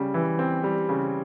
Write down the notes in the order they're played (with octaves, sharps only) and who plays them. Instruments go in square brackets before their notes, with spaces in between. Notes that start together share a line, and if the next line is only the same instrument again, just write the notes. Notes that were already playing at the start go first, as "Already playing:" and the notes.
Already playing: [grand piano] C#3 G3
E3
C4
G3
C#3